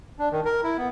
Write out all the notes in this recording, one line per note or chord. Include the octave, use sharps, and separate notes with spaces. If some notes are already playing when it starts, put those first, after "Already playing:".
D4
D#3
A#4
E4
B3